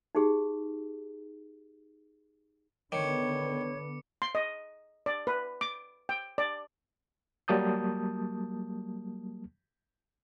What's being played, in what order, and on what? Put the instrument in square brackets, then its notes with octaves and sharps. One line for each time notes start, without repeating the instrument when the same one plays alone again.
[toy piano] D#4 G4 G#4
[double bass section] D3 B3 [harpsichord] D#3 [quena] C#5 [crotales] D6 C#7
[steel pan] C6
D#5
D5
B4
D6
G5
D5
[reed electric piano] F#3 G3 A#3 A5 D#6 G6